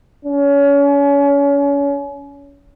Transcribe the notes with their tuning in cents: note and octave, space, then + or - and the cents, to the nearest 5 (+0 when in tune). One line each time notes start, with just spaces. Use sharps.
C#4 +30